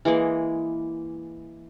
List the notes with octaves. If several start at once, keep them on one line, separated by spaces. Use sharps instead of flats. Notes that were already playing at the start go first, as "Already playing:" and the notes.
E3 G#3 A#3 G#4